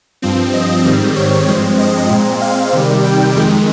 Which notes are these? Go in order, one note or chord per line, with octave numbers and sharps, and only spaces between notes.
G2 F3 C4
D#5
G#2 D#3 G3 C4
C#5
G2 F3 G#3 C4
D#5
A#2 G#3 C4
F5
C3 D#3 G3
G5
F2 D#3 G#3